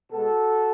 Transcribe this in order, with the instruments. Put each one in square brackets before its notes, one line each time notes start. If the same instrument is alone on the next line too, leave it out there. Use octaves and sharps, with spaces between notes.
[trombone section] B2 G#3 F#4 A4